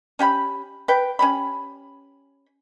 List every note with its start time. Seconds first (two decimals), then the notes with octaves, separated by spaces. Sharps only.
0.19 C#4 G4 F#5 B5
0.88 B4 G5
1.19 C#4 G4 B5